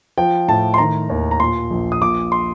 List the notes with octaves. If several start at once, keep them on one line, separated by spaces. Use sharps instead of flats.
F3 G5
A2 A5
C6
D#3 A#5
D#2
A#5
A#2 C6
A#1
D#6
A#2 D6
C6